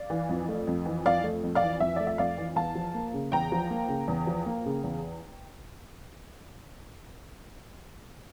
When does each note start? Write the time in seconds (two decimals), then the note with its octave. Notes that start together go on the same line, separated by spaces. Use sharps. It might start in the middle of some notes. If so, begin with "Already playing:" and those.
Already playing: D5 F5
0.10 E3
0.29 F2
0.48 A3
0.67 F2
0.86 E3
1.06 F2 D5 F5
1.23 A3
1.44 F2
1.55 D5 F5
1.62 E3
1.80 F2 E5
1.96 A3 D5
2.07 E5
2.18 F2 D5 F5
2.37 E3
2.56 E2 F5 A5
2.75 F3
2.94 A#3
3.14 C#3
3.32 E2 G5 A#5
3.52 F3
3.70 A#3
3.89 C#3
4.08 E2
4.27 F3
4.46 A#3
4.66 C#3
4.84 E2